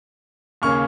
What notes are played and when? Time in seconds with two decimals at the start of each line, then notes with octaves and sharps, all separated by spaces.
0.62 D#2 C#3 A#3 C#4 C#6 F6